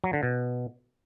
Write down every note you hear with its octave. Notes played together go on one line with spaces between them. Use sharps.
F#3
D3
B2